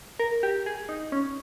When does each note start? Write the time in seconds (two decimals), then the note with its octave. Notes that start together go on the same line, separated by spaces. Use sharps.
0.19 A#4
0.43 G4
0.66 G#4
0.89 D#4
1.12 C#4